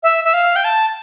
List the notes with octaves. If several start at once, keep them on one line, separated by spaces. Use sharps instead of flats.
E5
E5
F5
G5
A5